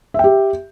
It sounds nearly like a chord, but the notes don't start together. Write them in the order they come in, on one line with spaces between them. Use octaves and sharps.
E5 G5 G4